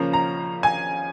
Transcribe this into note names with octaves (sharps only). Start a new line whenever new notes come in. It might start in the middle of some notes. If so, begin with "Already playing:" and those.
Already playing: C#3 F3 A#3 C#4 A#5
A#5
G#5